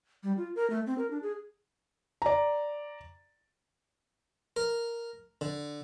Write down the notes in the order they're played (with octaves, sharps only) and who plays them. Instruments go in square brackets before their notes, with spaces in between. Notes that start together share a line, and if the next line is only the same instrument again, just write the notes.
[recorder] G3
F4
A#4
A3
C4
A#4
D4
G#4
[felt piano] D5 A#5
[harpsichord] A#4
D3